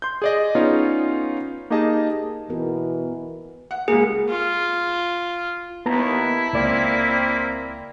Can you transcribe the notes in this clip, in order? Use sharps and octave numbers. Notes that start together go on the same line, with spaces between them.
C6 G6
G#4 D5 D#5
B3 C#4 D#4 F4 C#5
A#3 D#4 G4 G#4 D#5 A5
B2 E3 B3 F#4 A#4
F#5
C#2 A#3 G#4
F4
D#2 B3 E4 A5 A#5
C#2 A#3 C4 D5